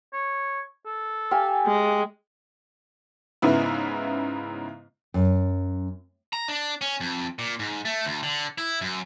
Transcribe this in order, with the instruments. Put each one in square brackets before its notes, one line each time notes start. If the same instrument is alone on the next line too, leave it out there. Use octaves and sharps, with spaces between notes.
[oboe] C#5
A4
[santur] G4 F5 G#5
[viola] G#3
[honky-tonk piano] G#2 C#3 B3 E4
[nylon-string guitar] F#2
[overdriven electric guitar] A#5
D4
C#4
F2
A#2
G#2
A3
D2
D3
E4
F#2